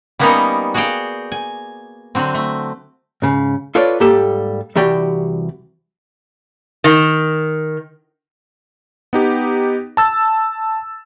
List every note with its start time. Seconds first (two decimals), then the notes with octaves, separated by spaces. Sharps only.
0.19 G3 A#3 B3 C#4 D#4 A#4
0.74 F#4 G#4 D5 F5 G5
1.32 G#5
2.15 D3 F#3 C4
2.34 A3
3.22 G#2 C#3
3.75 F4 A4 B4 C#5 D5
4.00 G#2 G3 A#3 G4 A4 A5
4.76 C2 E3 F#4 G4 D5 G5
6.84 D#3
9.13 B3 D#4 G4
9.97 A5 E6 A6